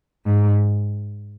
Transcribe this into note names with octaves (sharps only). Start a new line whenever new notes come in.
G#2